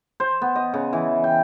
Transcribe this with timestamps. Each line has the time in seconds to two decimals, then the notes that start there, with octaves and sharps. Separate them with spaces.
0.20 C5
0.42 B3
0.56 D#5
0.74 C#3
0.93 E3
1.24 G5